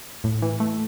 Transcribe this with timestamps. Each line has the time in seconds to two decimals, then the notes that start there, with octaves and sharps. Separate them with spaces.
0.24 A2
0.42 E3
0.60 A3